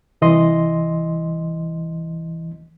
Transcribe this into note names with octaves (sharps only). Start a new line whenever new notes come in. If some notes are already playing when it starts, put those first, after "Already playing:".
C2 E3 D#5 C6